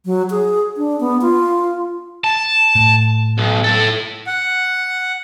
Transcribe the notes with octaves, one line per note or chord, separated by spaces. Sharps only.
F#3
G#4
D4
B3
F4
A5
A2
B1
E4 A4
F#5